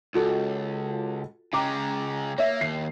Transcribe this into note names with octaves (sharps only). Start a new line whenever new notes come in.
C#2 F4 F#4 A4
C#3 G#3 G5 A#5 D6
A#3 C#5 E5
D#2 C7